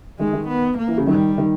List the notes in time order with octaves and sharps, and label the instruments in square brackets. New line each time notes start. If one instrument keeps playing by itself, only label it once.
[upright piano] D#3 [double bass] G#3
[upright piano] D#3
[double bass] B3
A#3
[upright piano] E3
C#3
[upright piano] D#3 [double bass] G3
[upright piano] D#3